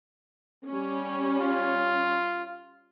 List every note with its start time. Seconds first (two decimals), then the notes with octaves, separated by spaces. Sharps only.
0.66 G3 C#4
1.39 F4